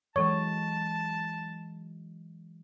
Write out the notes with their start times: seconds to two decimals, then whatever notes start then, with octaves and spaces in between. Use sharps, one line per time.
0.16 E3 F#3 G#3 C#4 A4 C#5 A5 C#6